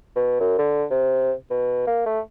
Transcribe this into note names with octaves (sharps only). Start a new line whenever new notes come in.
B2
F#2
D3
C3
B2
A#3
A3